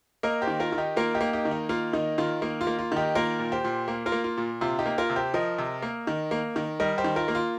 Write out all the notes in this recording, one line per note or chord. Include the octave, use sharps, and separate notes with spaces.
A#3 A#4 D#5
G4 C5
D#3
F4 A#4
D#3
D#4 G4
A#3 F4 A#4
D#4 G4
A#3
D#4 G4
D#3
D#4
A#3 F4
D#3 D#4
D#3 F4
A#3 D#4
F4
A#3
F4
D#3 D#4 G4
A#3 F4 A#4
A#2
G4 C5
A#2
A#3
F4 A#4
A#3
F4
A#2
C3 F4
D#4 G4
A#3
F4 A#4
C3
G4 C5
F3 A#4 D#5
C3
A#3
D#3
A#3
D#3
G3 A#4 D#5
G4 C5
D#3
F4 A#4
A#3
F4